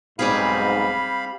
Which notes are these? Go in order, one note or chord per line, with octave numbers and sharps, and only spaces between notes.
B1 G#2 G3 C4 G#4 F5 B5